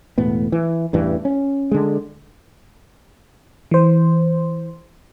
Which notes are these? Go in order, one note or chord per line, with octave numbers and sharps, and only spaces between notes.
E1 A2 B3
E3
A1 E2 G2 E3
C#4
D3 G#3
E3 C5